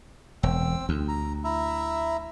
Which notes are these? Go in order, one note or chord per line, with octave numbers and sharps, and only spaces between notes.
E1 C4 E6
D2
A#5
E4 E5 A#5